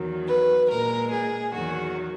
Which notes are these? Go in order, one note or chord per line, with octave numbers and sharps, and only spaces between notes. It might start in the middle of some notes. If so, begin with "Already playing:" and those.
Already playing: E2 D#3 F#3
B4
A#2 G#3 A#4
G#4
E2 D#3 F#3 F#4